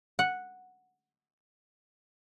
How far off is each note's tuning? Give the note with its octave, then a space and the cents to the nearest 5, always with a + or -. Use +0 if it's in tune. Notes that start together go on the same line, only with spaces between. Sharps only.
F#5 -5